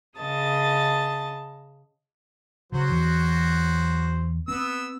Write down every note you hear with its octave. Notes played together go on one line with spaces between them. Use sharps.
C#3 D#5 A5 A6
C#3 F#3 F#4 C5
E2 E3
B3 C4 E6